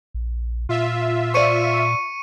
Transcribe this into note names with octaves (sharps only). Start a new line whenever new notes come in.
A#1
A#2 F4 E5
C5 D5 C#6 C#7 D#7